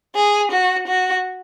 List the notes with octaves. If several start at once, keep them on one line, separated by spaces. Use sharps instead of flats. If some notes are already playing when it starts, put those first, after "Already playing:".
G#4
F#4
F#4